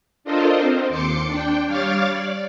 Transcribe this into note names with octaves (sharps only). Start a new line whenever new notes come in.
D4 F4 A4 A#4 C5 D#5
C4
D#2 C6 D6 C#7
D4 G5
G3 C#5 F5 D6 F6 A6
D5